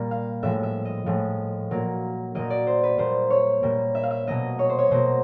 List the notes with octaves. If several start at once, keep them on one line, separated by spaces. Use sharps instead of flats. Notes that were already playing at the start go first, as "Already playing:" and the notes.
Already playing: A#2 G3 A#3
F5
A2 F3 G#3 E5
E5
D#5
A2 F3 G#3
A#2 F#3 A#3
A#2 F#3 A#3 D#5
D5
C5
B4
A#2 G3 A#3 C5
C#5
A#2 G3 A#3
E5
F5
E5
B2 F#3 A#3 D#5
C#5
C5
C#5
B2 F#3 A#3 C5